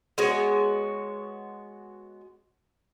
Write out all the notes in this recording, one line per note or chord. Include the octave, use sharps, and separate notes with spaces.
G#3 B3 F#4 C#5